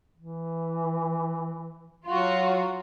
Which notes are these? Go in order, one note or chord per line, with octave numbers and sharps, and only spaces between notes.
E3
F#3 F4 F#4